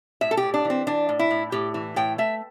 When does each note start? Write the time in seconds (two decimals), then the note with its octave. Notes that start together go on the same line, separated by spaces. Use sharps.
0.21 A2 E5
0.31 A4
0.37 G4
0.43 A2
0.54 D4
0.65 E3
0.70 C4
0.87 E3 D4
1.09 A2
1.19 E4
1.31 A2
1.52 A2 G4
1.74 E3
1.96 A2 G5
2.18 A3 E5